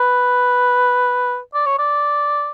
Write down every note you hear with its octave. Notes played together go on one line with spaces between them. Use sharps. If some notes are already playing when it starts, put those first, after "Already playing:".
Already playing: B4
D5
C#5
D5